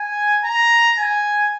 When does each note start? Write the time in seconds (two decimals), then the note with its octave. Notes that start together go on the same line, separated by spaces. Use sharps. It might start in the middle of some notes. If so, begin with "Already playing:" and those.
Already playing: G#5
0.44 A#5
0.98 G#5